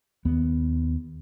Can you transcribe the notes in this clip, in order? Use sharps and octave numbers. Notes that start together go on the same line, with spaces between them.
D#2 B3